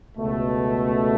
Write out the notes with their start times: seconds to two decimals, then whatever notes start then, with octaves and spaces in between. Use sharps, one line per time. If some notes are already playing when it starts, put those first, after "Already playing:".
0.17 C#2 B2 A3